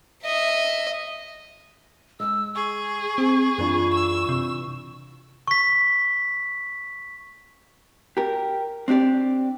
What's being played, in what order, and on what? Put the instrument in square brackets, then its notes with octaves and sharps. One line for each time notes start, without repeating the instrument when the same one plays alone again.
[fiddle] D#5 E5
[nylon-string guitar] G#3 [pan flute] E6
[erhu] G#4 [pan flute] C#6
[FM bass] C4
[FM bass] F#2 [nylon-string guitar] E3 D4 F4
[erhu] E6
[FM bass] C3
[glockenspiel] C#6 B6
[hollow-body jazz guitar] G4 A#4
C4 D4 G4 D5